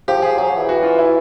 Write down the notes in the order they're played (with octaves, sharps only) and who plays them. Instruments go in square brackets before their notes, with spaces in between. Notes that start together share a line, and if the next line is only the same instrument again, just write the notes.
[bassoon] F3 [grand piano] G4
[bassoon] F3 [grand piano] G#4
[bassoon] F#3 [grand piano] G#4
[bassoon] F3
E3
[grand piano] F#4
F4
E4